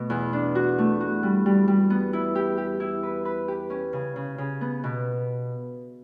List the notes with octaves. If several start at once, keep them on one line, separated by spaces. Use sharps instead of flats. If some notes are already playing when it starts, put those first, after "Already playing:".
Already playing: B2 A3
E2
D4
F#4
A3
F#4
G3
G3
G3
B3
E4
G4
G4
E4
B4
B4
G4
C#4
C#3
C#3
C#3
B3
B2